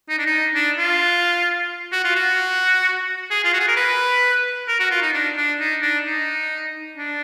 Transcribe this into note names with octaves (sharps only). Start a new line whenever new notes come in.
D#4
D4
D#4
D4
F4
F#4
F4
F#4
G#4
F4
F#4
G#4
A#4
B4
A#4
F#4
F4
D#4
D4
D4
D#4
D4
D#4
D4